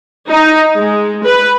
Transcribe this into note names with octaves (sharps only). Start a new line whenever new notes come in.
D#4
G#3
B4